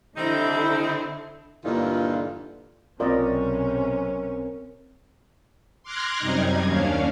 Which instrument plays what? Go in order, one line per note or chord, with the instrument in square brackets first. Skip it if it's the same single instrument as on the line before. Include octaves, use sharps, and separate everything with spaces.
[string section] D3 E4 [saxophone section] G3 C4 D#4
[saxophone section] G2 A#2 D3 E3 D#4 F4
[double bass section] B1 C3 C#4 [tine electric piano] C4 A#4 [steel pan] F4 D5 D#5
[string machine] C6 D6 F6 F#6 G#6 A#6
F#2 C3 G3 D#4 G#6
D#2 C#4 D4 F5